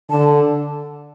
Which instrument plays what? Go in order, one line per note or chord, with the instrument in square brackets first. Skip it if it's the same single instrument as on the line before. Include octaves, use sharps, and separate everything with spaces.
[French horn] D3 [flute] A5